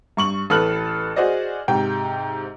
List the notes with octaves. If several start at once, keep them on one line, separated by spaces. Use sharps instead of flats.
G2 C#6 F#7
A1 A4 B4 F6 F#6 F#7
F#4 G#4 C5 D5 D#5
G#2 C3 G5